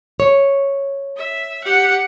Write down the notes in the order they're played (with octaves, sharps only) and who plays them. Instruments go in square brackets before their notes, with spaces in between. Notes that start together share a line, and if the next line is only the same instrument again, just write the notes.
[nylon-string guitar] C#5
[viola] E5
G4 F#5